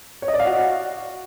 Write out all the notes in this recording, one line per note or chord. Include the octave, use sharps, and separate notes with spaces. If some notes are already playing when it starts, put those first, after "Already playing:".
C#5
D#5
D5
F5
F#4